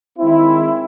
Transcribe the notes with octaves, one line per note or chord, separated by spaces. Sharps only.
D#3 G#3 C4 E4